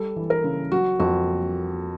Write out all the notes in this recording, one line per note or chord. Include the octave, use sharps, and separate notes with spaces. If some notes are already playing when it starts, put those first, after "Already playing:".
Already playing: G3 A4
E3
A#4
C#3
F#3 F#4
F2 F#4